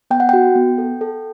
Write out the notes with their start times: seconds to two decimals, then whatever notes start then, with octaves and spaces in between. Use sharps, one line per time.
0.11 B3 G5
0.20 F#5
0.29 F#4 G5
0.56 B3
0.78 A4
1.01 A4